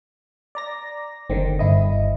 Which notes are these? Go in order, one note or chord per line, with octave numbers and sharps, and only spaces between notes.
D5 A#5 A#6
F#1 D3 D#3 C4
G1 E4 D#5